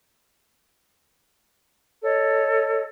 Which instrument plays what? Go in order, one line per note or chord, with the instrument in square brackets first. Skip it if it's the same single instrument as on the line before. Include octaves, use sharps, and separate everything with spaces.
[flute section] A4 C#5 D#5